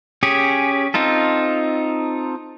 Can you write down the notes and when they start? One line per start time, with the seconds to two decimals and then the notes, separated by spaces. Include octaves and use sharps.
0.23 C#4 G4 G#4
0.94 C4 D#4 F4 A4